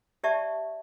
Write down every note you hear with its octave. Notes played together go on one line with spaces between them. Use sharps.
G4 D5 E5 A5 C#6